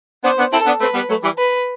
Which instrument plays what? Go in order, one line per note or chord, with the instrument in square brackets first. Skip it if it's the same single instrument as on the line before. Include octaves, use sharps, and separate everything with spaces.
[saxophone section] B3 D4 [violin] C5
[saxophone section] B3 D4
[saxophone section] C4 E4 [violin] A4
[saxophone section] B3 D4
[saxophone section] A3 C4 [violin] B4
[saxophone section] G3 B3
F#3 A3
E3 G3
[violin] B4